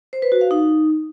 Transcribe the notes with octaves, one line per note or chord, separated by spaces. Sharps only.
C5
B4
F#4
F5
D#4